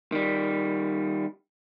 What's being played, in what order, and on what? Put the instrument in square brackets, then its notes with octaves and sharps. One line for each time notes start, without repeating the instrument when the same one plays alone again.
[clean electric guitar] D#3 G3